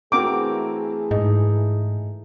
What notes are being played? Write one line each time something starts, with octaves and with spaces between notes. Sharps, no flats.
E3 A3 C4 F#4 G#4 A#4 D6
G#2 D#4